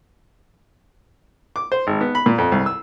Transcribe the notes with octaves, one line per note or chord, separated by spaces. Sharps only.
D6
C5
G#1
B3
B5
A#2
F2
C2
E6